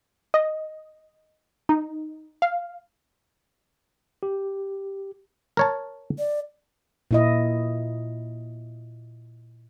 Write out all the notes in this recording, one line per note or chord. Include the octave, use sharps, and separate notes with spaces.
D#5
D#4
F5
G4
A#4 C#5 A5
D5
A#2 E4 D#5